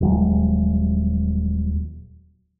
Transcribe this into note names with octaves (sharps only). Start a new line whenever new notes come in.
D#1 D#2 F#3 G#3